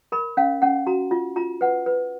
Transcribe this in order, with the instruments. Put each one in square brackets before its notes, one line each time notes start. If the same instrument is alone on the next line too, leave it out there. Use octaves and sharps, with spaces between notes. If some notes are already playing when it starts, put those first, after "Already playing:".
[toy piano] A#4 B5
C#4 F5
C#4 F#5
F#4 A#5
F4
F4 A#5
B4 F#5
B4